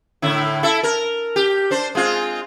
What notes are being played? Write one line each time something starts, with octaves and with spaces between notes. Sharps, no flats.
A2 D3 E4
E4 A4
A#4
G4
D4 C5
G#3 C4 F4